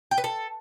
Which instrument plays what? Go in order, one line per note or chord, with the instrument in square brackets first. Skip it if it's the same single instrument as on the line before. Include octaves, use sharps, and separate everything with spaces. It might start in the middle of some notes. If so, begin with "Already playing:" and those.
[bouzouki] G5
B4
A4